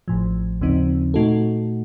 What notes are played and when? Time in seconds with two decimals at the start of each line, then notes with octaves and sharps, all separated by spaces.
0.08 A1 A2 F3
0.61 D#2 C#3 F3 C4 D#4
1.14 A#2 A3 D#4 F#4 A4